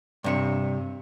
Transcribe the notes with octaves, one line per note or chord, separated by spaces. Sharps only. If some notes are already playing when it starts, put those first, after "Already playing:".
G2 C3 C#5